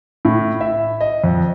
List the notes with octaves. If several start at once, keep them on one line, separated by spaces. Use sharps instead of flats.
A2
E5
D#5
F2